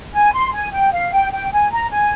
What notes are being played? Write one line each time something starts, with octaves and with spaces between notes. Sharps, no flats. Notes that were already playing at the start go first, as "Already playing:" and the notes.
G#5
C6
G#5
G5
F5
G5
G5
G#5
A#5
G#5